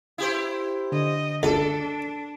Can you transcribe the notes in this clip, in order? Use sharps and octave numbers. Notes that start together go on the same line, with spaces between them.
E4 G4 C5
D3 D#5
C#2 D4 A4